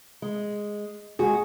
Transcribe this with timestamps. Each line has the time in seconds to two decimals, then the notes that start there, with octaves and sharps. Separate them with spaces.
0.22 G#3
1.19 G#3 F#4 G#4